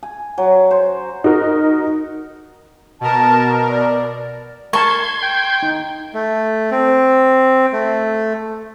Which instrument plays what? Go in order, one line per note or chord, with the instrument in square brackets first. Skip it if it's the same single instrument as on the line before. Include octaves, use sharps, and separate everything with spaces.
[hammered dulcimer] G#5
F#3
C5
[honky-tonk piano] D#4 F#4 A#4
[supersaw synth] B2 A#4 [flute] A5
[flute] D5
[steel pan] A#4 A5 [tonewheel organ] C6 G#6 [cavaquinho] C#6
[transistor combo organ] G5
[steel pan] D#4
[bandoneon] A3
C4
A3